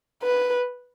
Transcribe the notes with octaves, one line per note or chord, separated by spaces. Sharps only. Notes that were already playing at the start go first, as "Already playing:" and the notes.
B4